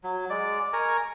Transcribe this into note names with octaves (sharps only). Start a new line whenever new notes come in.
F#3
G#3 D5
A#4 G#5 A#5 C#6